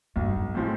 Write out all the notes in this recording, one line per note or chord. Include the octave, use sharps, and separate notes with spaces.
B1 G2
A2 F3 G#3 C4